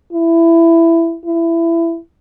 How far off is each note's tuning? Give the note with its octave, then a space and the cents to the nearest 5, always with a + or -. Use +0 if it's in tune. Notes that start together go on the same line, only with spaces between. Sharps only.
E4 +15
E4 +20